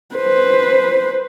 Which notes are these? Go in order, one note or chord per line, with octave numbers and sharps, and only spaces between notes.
B4 C5